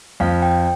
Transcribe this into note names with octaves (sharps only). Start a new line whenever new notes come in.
F2 F5
G5